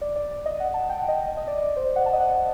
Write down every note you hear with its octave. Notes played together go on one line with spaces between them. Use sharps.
D5
D5
D5
D#5
F#5
A5
G5
F#5
D#5
D#5
D5
D5
C5
D5
F#5
A5
D#5
F#5